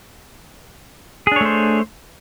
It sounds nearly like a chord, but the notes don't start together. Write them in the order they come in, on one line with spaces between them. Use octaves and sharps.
G#4 D4 C#5 A3 C5